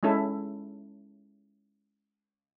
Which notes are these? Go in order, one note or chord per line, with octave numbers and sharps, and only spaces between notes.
G#3 C#4 E4 A4